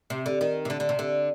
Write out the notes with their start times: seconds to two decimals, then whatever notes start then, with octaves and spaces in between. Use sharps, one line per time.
0.10 C3
0.26 D3
0.41 D#3
0.65 C3
0.70 D3
0.80 D3
0.89 C3
0.99 D3